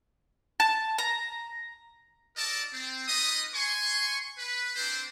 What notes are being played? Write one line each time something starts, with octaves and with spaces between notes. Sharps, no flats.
A5
A#5
D#4 A4 A#4 D5 D#5 A5
C4
A#3 D#4 F4 B4 D#5 D#6
G#5 C6 C#6
B4
C4 D4 C5